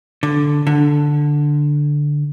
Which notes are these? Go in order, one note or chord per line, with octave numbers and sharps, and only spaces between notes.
D3
D3